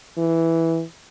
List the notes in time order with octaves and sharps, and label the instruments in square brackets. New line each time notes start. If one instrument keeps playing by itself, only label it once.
[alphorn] E3